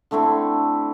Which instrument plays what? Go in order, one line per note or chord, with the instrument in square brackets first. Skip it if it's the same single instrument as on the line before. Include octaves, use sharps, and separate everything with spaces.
[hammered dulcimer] D3 A3 C4 E4